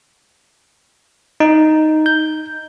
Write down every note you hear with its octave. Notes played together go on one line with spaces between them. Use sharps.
D#4
G6